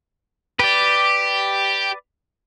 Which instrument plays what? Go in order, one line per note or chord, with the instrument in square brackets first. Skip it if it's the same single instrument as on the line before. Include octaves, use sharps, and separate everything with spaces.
[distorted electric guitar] G4 [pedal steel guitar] B4 D5